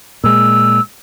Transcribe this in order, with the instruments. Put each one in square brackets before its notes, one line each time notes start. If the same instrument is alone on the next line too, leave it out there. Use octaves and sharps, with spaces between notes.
[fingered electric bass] A#2 G#3 [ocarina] E6